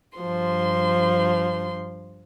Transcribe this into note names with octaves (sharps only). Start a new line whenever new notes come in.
G2 F3 C6